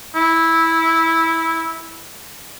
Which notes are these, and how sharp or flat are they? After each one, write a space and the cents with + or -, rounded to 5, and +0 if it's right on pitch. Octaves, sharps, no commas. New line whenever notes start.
E4 -10